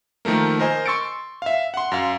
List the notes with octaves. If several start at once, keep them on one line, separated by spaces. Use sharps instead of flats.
D#3 F3 A3 A#3
A#4 C5 D#5 G#5
C6 C#6 E6 A6 C#7 D7
E5 F5
F#5 C6
F#2 F5